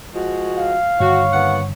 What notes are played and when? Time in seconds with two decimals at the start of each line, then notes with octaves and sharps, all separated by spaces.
0.14 F3 G#3 F#4
0.58 F5
1.00 G2 D3 D#3 F#4 C#5
1.33 D#2 B3 F#5